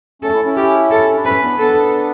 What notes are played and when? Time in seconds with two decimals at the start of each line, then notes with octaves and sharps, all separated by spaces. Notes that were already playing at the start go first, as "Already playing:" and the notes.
0.22 A3 C#4 A4
0.33 C#4 E4
0.45 C#4 E4
0.56 G4
0.91 A4
1.15 D4
1.25 C#4 E4 B4
1.42 B3 D4
1.59 B3 D4 A4